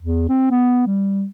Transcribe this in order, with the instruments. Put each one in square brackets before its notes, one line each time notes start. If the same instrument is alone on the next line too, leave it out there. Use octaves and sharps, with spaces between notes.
[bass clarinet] E2
C4
B3
G3